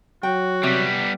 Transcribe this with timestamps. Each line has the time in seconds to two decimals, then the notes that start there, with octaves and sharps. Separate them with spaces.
0.23 F#3 F#4 G5
0.63 C3 G3 B3